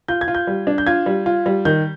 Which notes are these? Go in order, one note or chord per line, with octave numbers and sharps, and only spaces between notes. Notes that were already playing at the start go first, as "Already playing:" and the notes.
F4 G6
G#6
F4
G6
G3
D4
G6
F4 G#6
G3
F4
G3
D#3 G6